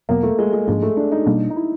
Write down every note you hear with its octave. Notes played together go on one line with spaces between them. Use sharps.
E2 B2 F#3 A#3 B3
A3
G#3
G#3
G#2 F3 G#3 A#3 D4
A3
D4
D#4
B2 G3 A#3 D4
D#4
E4